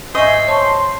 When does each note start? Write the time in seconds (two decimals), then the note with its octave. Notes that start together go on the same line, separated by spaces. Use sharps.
0.15 G#2 C5 D#5 E5 G#5 C#6
0.47 C#5 A5 C6 C#6